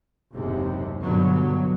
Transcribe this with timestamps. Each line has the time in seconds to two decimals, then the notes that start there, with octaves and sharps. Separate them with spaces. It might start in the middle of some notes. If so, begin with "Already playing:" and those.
0.33 F#1 D#2 G#2 C3
1.01 G2 B2 D3 F#3